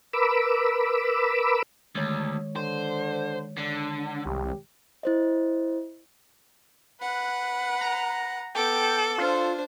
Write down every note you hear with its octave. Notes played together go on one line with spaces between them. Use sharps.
A#4 B4 B5 D6 E6
D2 D#3 G#3 C#5
D3 C5
D3 D4
C2 G4
E4 C5 D#5
B4 F#5
A#5
B3 A4 G5 D6
D4 F4 C5